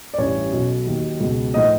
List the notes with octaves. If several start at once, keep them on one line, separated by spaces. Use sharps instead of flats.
D5
A1 G2 E3 C#4 C#5
B1 B2 F#3
D#2 D#3 F#3
C#2 B2 F#3
A2 F3 D#4 D#5